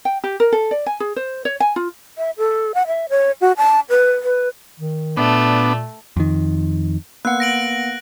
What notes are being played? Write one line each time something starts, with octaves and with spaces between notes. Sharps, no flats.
G5
G4
A#4
A4
D5
G#5
G#4
C5
C#5
G#5
F4
E5
A4
F#5
E5
C#5
F#4
A5
B4
B4
D#3
A#2 A3 B3 D4
F2 D#3
A#3 B3 F#5 F#6
A#6 D7 F#7